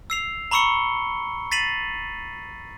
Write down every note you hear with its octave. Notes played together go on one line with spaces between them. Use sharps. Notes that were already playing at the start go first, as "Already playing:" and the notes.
E6 C7 F7
A#5 B5 C#6 E6 C#7 G7
A6 B6 C7 D#7 F7 F#7